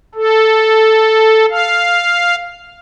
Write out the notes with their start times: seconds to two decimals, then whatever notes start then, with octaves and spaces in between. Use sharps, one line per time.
0.15 A4
1.50 F5